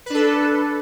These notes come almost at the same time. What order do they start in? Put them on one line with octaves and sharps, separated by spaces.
B4 D4 A4